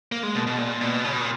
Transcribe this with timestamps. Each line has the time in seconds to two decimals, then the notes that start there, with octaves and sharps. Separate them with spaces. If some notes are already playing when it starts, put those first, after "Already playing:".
0.12 A#3
0.23 G#3
0.35 B2
0.47 B2
0.58 A#2
0.81 B2
1.04 C#3
1.13 B2
1.21 A#2